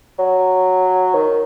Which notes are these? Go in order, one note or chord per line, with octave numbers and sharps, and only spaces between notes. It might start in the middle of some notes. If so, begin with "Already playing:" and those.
F#3
D#3